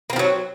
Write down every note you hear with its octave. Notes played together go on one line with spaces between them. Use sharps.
F3 F#3 A#3 C4